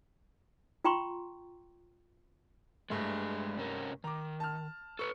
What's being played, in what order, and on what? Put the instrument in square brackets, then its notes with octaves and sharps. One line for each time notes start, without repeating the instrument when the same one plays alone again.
[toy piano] F4 G5 A#5 C6 C#6
[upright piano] G2 A3 [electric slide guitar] G#3 D4 G#4
[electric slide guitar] C3 C#4 A#4
[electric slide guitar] D#3 [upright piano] A#5 D6
[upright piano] A5 F6
[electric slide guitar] A4 B4 [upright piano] C#6 C#7